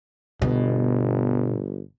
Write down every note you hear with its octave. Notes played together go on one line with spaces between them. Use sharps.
G1 B2